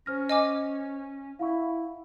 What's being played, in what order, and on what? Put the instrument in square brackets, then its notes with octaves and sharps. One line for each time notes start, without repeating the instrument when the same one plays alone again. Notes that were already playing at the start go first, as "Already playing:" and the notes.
[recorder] C#4 [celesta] C5 F6 A#6
[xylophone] D#5 G#5 D6
[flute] E4 [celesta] F5 F#5 C#6